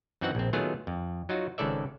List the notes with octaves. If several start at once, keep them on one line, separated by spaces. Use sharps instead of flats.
F#2 E3 C4 D#4 F#4 F#5
A#1 C4
D#3 F#3 A3 B3 F4 G#4
F2
F#3 D#4 F4 F#4
G#1 G#2 C#3 A4 D5 E5